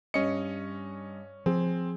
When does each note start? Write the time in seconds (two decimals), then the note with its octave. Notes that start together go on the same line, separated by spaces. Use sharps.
0.14 G2 C#4 D#5 C#7
1.46 F3 C4 G#4